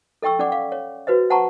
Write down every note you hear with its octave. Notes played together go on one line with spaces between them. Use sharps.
A4 D#5 G5 C#6 E6
C#4 D5 F#5 D6
F5 D6
C#5
F#4 B4 C5 D#5
C5 F#5 A5 A#5 C#6